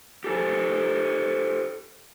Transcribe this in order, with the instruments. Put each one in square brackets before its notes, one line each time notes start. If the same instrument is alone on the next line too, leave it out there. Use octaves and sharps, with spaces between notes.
[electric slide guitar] G4 A4 C5